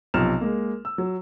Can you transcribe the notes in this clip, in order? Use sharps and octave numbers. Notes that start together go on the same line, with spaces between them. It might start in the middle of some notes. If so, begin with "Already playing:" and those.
B1 C3 F3 F6 E7
G#3 A#3
E6
F#3